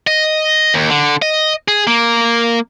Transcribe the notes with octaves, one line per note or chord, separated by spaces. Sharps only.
D#5
D#2
D3
D#5
G#4
A#3